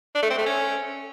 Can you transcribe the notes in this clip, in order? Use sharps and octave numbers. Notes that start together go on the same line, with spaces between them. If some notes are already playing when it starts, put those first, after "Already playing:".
D4
A3
C4
A3
C#4